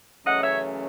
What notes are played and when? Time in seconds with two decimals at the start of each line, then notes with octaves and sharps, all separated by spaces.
0.25 F#2 C#3 E3 A3 C#4 D#5 F#5
0.43 C#5 E5